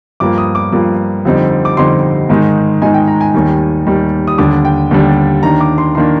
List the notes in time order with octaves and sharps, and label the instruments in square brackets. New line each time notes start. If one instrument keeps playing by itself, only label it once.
[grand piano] G2 F3 A#3 D6
D#6
D6
G2 F3 A#3
F2 D3 G3 C4 D#4
D6
F2 D3 G3 C4 D#4 C6
G#2 D#3 G#3 D#4
G#2 D#3 G#3 D#4 G#5
G5
A#5
G#5
D#2 D#3 G3
D#2 D#3 G3
D#6
D#2 D3 G3 D4 D6
G5
D#2 D3 G3 D4
D#2 D#3 A#3 D4 A#5
D6
C6
D#3 A#3 D4 C6